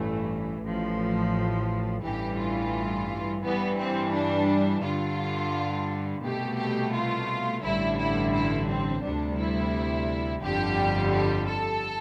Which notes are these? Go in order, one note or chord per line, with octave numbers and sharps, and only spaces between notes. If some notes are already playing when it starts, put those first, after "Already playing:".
Already playing: A1 G2 E3 A3
A1 A2 F3
A1 G2 E3 G3 G4
F4
G2 E3 G3 B3
C4
D4
G2 D3 G3 F4
C2 B2 A3 G4
G4
F4
A1 G2 D3 G3 E4
E4
E4
C4
D2 C3 G3 D4
E4
G1 F2 D3 G3 G4
G4
A4